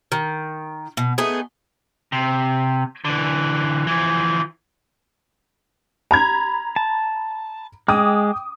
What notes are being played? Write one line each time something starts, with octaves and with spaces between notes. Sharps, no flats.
D#3
B2
A3 B3 D#4 G#4
C3
D3 E3
E3 F3
A#5 B5 G#6
A5
G#3 G5 D6 D#6